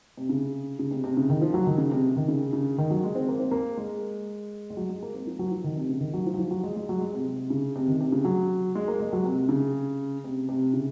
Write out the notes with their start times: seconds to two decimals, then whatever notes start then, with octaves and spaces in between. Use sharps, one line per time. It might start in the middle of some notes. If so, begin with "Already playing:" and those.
0.17 C3
0.29 C#3
0.79 C#3
0.91 C3
1.04 C3
1.17 C#3
1.30 D#3
1.41 F3
1.54 F#3
1.67 D#3
1.78 C#3
1.92 C3
2.17 D#3
2.28 C#3
2.53 C#3
2.78 D#3
2.91 F#3
3.04 G#3
3.15 C4
3.28 A#3
3.40 C4
3.51 A#3
3.77 G#3
4.70 G#3
4.77 F#3
4.89 G#3
5.02 A#3
5.14 C4
5.27 F3
5.39 F#3
5.51 F3
5.64 D#3
5.76 C3
5.89 C#3
6.01 D#3
6.14 F#3
6.26 F3
6.34 F#3
6.39 F3
6.51 F#3
6.64 G#3
6.76 G#3
6.89 F#3
7.01 G#3
7.14 C3
7.26 C3
7.50 C#3
7.76 C3
7.88 D#3
8.01 C3
8.12 C#3
8.25 F#3
8.75 G#3
8.88 A#3
9.00 G#3
9.13 F#3
9.25 C3
9.49 C#3
10.24 C3
10.49 C3
10.74 C#3